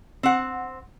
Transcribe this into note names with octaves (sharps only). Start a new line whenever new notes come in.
C4 F#5